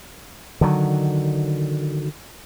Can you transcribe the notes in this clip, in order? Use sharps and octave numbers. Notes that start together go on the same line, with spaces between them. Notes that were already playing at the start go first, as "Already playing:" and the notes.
D3 D#3 F#3